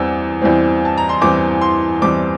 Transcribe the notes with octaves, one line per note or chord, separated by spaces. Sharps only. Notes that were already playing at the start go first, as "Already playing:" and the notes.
Already playing: E2 E3 G3 C4 E6
E2 E3 G3 C4
A5
A#5
C6
E2 E3 G3 C4 D6
C6
E2 E3 G3 C4 D6